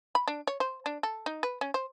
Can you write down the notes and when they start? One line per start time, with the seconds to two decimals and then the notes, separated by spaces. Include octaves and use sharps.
0.15 B5
0.28 D4
0.47 C#5
0.60 C5
0.86 D4
1.03 A4
1.26 D#4
1.43 B4
1.61 C#4
1.74 C5